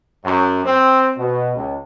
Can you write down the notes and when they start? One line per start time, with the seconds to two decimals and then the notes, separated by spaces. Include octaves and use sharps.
0.24 F#2
0.64 C4
1.17 B2
1.55 C#2